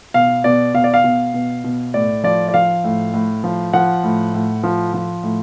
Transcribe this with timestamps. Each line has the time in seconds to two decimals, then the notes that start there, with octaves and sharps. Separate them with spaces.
0.14 B2 F5
0.44 B2 D5
0.74 B2 F5
0.84 D5
0.94 F5
1.04 B2
1.34 B2
1.64 B2
1.94 A2 D5
2.24 F3 D5
2.48 D5
2.54 F3 F5
2.84 A2
3.14 A2
3.44 F3
3.73 F3 F#5
4.04 A2
4.34 A2
4.63 F3
4.94 F3
5.23 A2